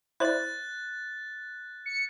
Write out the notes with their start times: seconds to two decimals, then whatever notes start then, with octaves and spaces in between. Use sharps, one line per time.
0.20 E4 C5 D5 F#6 A6
1.86 C#7